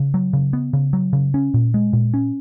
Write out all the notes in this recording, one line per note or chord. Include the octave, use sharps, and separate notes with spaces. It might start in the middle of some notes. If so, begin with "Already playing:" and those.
Already playing: C#3
F#3
C#3
B3
C#3
F#3
C#3
C#4
A#2
G#3
A#2
C#4